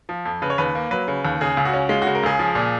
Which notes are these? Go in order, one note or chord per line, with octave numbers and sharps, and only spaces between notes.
F3
F2
C#3 B4
C#5
D#2 B4
A#3
F#3 B4
C#3
D#2
C#3 G#4
C#2
F#4
C#4
G#3 F4
C#3 F#4
A#4
C#2 G#4
F3
A#2